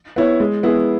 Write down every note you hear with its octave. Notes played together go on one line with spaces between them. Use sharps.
B3 E4 C#5
G#3
B3 E4 G#4